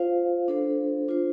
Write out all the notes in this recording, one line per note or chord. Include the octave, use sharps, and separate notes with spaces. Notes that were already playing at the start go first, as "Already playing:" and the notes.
Already playing: F4 C5 F5
D4 A4 C5
D4 F4 C5